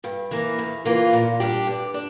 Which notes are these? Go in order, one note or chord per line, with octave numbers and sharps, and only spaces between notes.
G2
E3 A#3
E2
E3 A#3 F4
A#2
G3 D4 G4
G2
D4